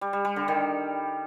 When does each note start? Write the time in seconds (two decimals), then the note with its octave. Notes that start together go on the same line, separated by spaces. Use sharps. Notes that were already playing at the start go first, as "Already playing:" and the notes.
0.01 G3
0.13 G3
0.25 G3
0.36 D3
0.48 D#3